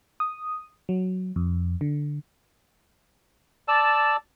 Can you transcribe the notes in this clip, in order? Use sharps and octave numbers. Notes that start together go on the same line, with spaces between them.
D#6
F#3
F2
D3
D5 A5 E6